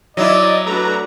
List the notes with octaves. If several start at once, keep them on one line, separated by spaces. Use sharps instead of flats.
F#3 E4 D5 D#5
A3 D4 F#4 B4 A#5